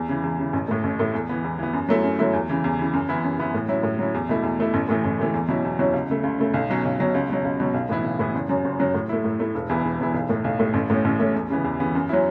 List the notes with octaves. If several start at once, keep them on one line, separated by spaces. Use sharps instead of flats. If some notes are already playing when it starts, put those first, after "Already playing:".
Already playing: E2
C#3 E3
E2
C#3 E3
A1
A2 A3
A1
A2 A3
E2
E3 B3
E2
E3 B3
F#2
F#3 A3 E4
F#2
F#3 A3 E4
E2
C#3 E3
E2
C#3 E3
F#2
E3 B3 E4
F#2
E3 B3 E4
A2
F#3 C#4 E4
A2
F#3 C#4 E4
E2
B2 A3 E4
E2
B2 A3 E4
A1
A2 E3 A3
A1
A2 E3 A3
E2
B2 F#3 C#4 E4
E2
B2 F#3 C#4 E4
C#2
C#3 A3
C#2
C#3 A3
B1
B2 F#3 C#4
B1
B2 F#3 C#4
C#2
B2 F#3
C#2
B2 F#3
B1
A2 E3 B3 E4
B1
A2 E3 B3 E4
F#1
F#2 F#3
F#1
F#2 F#3
A2
A3 E4
A2
A3 E4
E1
E2 E3 B3 E4
E1
E2 E3 B3 E4
B1
A2 A3
B1
A2 A3
A1
A2 A3 C#4
A1
A2 A3 C#4
E2
C#3 E3 B3
E2
C#3 E3 B3
F#2
F#3 C#4 E4